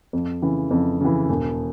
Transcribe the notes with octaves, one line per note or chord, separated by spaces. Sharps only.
F2
C#3 E3
F2
C#3 E3
E1